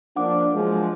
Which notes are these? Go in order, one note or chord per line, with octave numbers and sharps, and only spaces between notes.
F3 A#3 D4 F#5 D6
F3 F#3 G#3